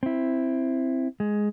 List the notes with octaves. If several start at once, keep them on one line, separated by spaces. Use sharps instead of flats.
C4 E4
G#3